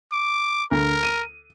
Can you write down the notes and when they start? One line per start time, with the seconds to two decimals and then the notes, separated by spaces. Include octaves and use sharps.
0.12 D6
0.71 D2 A#4
1.03 D#7